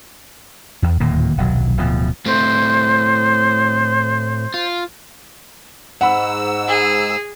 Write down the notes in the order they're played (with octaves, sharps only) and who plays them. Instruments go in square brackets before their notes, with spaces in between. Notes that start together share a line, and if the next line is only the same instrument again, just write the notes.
[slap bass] E2
D1 D#2 A#2 A#3
D#1 B1 F#3
D1 B2 F3
[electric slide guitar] A2 A3 C4 [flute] C5
[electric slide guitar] F4
[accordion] G#2 E6 [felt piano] F#5 B5
[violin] G#4